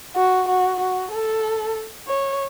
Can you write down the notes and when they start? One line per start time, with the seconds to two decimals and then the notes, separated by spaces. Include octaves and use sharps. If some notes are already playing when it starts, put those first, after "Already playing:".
0.16 F#4
0.48 F#4
0.80 F#4
1.12 A4
2.07 C#5